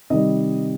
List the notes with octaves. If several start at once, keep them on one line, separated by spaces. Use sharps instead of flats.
C3 D#3 G3 D#5